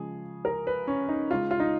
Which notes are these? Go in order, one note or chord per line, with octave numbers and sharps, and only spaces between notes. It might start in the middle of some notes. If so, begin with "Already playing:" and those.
Already playing: C#3 F3 G#3 G#4
A#4
B4
C#4
D#4
C#3 G#3 F4
F4
D#4